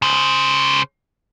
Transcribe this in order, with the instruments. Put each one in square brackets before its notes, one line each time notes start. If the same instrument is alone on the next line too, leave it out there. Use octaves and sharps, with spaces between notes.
[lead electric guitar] C#3 C5